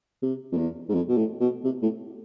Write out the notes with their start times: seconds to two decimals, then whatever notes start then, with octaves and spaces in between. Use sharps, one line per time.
0.22 C3
0.52 F2
0.57 E2
0.89 G#2
0.94 F2
1.09 B2
1.17 A2
1.41 B2
1.64 C3
1.82 A2